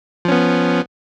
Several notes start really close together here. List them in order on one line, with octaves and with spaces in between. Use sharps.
F3 C#4 B3